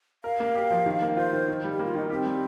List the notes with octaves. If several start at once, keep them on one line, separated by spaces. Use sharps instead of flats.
A#4 F5
A#3
G4
F3
D#3
A#3
F4 C5
D#3
D#3
G3
G4
A#3
F4
D#3 D#4
C4 G4
G3